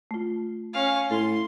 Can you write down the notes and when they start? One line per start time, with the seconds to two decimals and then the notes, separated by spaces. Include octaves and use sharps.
0.11 A3 F4
0.74 C#4 F5
1.11 A2 A4 C6